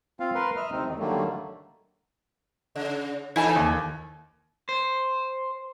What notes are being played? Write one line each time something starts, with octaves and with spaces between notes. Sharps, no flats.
C4 F4 F5
A#4 B4 C6
D#5 E5 F6
D2 C3 C4 D#4
E2 D#3
D3 D#3 F#3 G3 A3 A#3
C#3
E3 D#4 E4 A4 G#5 A5
D#2
C5